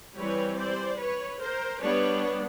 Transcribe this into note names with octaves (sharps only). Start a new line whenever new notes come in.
E3 G3 C4 B4 C#5
C5 D5
B4 C#5
A#4 C5
G3 B3 D4 B4 C#5